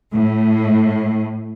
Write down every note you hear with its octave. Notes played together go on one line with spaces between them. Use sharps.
A2